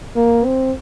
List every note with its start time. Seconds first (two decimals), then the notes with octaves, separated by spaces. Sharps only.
0.16 A#3
0.45 C4